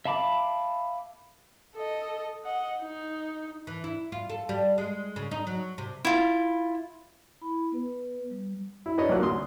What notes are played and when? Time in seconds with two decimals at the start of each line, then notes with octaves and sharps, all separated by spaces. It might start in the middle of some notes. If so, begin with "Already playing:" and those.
0.05 E5 F5 A5 B5 D6
1.75 A4 D#5
2.45 D#5 F#5
2.82 D#4
3.67 E3
3.84 E4
4.12 F4
4.29 A4
4.49 G3
4.78 G#3
5.16 C#3
5.31 D#4
5.47 F#3
5.78 C3
6.05 E4 F4
7.41 E4 B5
7.72 B3 B4
8.30 G3
8.86 E4
8.98 D4 D#4 B4 C#5 D#5
9.09 A1 F#3 A#3 F4 F#6
9.22 D2 C6 D#6